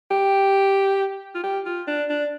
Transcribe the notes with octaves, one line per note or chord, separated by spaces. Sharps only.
G4
F4
G4
F4
D4
D4